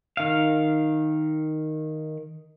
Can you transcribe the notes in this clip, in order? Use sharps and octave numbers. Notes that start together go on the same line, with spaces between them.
D#3 F5